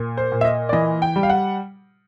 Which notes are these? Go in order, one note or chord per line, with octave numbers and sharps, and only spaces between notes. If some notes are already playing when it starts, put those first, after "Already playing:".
Already playing: A#2
C5
A#2
E5
D#5
D5
E3 D#5
G5
G3
F5
F#5